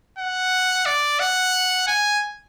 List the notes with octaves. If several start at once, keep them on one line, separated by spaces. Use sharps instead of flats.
F#5
D5
F#5
G#5